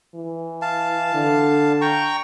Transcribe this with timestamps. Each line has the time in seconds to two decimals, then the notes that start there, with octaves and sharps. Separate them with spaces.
0.15 E3
0.62 F5 A5
1.15 D3
1.81 G5 A#5 C#6